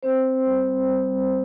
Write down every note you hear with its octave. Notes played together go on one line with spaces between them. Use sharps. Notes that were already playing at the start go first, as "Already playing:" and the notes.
C4 C5
G3
G3